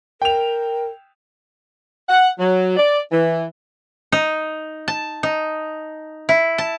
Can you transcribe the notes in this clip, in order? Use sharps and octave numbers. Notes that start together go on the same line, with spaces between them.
A#4 G5 F7
F#5
F#3
D5
E3
D#4
A5
D#4
E4
A5